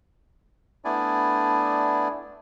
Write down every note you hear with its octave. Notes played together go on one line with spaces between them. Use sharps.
A3 B3 D4 E4 D5 G#5